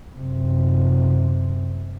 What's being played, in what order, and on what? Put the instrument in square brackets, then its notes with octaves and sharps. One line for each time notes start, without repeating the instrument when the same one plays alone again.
[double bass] F#2 C3